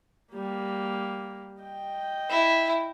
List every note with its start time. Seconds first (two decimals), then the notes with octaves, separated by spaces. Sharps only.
0.33 G3 A#3
1.62 D#5 G5
2.30 E4